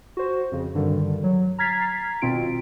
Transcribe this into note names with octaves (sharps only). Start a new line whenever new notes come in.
F#4 C5
F2 C#3
G2 D3 D#3 G3
F#3
A#5 F6 G#6 A6 B6 C7
G#1 B2 C4 F4 D7